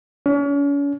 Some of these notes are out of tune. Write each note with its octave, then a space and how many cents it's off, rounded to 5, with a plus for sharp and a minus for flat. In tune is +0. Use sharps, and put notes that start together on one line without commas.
C#4 +40